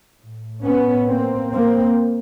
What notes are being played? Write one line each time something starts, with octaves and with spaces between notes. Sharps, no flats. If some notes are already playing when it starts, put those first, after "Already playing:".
A2
B3 C#4
A#3 C4
A#3 C4